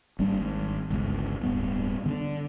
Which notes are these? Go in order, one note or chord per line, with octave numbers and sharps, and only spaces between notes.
G#1 G3 A#3 D4
G#1
G1 C#2
D1 G2 B3
D3 C4 D4